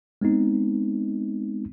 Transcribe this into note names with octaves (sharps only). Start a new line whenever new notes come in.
G#3 B3 C4 D#4